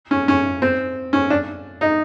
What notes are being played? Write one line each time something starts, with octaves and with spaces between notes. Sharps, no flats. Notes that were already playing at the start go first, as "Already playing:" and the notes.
C#4
C#4
C4
C#4
D4
D#4